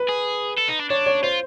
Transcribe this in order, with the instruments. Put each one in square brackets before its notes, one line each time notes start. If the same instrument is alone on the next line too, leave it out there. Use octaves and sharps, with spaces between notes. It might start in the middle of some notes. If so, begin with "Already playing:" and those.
Already playing: [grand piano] B4
[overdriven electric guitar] G#4
A4
D#4
D4
[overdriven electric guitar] D4 [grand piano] C#5
[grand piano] C#5
[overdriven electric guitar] F4 [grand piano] C5